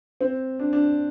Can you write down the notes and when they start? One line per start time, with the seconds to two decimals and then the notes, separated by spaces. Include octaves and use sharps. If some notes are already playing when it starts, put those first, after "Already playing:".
0.21 C4
0.59 D4
0.73 D4